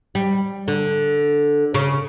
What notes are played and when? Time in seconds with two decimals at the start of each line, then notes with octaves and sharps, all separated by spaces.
0.15 G3
0.68 D3
1.74 C#3